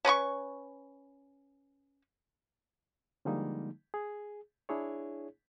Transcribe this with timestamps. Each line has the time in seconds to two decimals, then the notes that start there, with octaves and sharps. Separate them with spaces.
0.05 C#4 B4 B5 C#6
3.25 D3 F3 G3 G#3 A#3 D#4
3.94 G#4
4.69 D4 E4 G#4 C#5